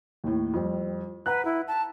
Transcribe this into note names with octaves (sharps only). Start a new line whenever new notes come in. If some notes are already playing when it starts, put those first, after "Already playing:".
D#2 A2
F2 G3
B4 F#5 A#5 F#6
E4
A5